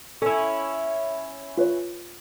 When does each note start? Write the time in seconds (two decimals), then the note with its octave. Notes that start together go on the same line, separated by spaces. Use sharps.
0.22 C#4 E4 A4
1.57 F4 B4 C#5